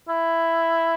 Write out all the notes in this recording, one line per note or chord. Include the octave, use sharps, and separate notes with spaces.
E4